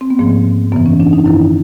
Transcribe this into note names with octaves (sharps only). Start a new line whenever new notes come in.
C4
B3
G#2 F3 A#3
F#2 C#3 E3 B3
C#4
D4
D#4
F#2 D#3 E4